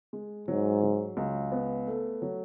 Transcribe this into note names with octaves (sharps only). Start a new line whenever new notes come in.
G#3
G#2 F#3
F#3
C#2
B3
A3
F#3